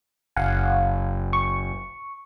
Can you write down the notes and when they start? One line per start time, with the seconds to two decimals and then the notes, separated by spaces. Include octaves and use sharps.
0.36 F#1 F5 F#5 G#5
1.33 C#6